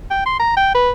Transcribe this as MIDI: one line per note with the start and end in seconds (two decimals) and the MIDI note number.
0.11 0.23 79
0.26 0.38 84
0.40 0.53 82
0.57 0.70 79
0.75 0.91 71